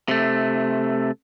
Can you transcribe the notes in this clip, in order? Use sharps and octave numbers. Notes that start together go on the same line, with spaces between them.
C3 A3